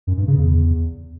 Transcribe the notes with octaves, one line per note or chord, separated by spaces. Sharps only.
F#2
G2
C#3
E2